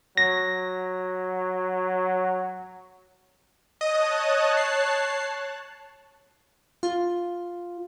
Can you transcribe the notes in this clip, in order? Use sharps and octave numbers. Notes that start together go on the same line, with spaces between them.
F#3 A#6
C#5 D#5 A5 D#6 F#6
C7
F4